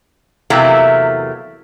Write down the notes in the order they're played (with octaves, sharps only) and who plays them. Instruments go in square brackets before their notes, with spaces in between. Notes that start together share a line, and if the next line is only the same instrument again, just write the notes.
[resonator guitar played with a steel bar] E2 C3 F#3 A3 A#3 E4